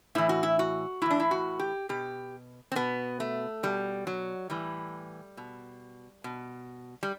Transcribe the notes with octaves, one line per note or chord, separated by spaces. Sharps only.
A2 E3 E4
F#4
E4
F#4
A2 E3 D4 E4
E4
F#4
G4
B2 G4
C4
B2 B3
A3
B2 G3
F#3
A2 E3 G3
B2
B2
G3